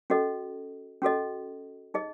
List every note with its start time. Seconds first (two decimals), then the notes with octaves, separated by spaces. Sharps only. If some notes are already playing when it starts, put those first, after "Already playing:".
0.10 C#4 F#4 A4 D#5
1.02 C#4 F#4 A4 D#5
1.94 D#4 G#4 D#5